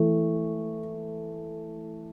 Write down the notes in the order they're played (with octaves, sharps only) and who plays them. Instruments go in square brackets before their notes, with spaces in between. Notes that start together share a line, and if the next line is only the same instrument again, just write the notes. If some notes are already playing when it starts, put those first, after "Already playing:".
Already playing: [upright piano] E3 A3